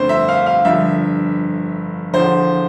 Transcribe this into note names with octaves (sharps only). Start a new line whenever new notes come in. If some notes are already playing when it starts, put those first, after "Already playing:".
Already playing: G1 F2 D3 A3 C4 C5
E5
F5
F5
G1 G2 F3 E5
E2 D3 F3 C5